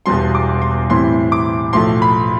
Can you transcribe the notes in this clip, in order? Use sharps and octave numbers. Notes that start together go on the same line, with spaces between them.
E1 E2 B2 G3 C6
D6
C6
A2 E3 G3 C4 E4 C6
D6
B1 A2 F3 A3 C6
B5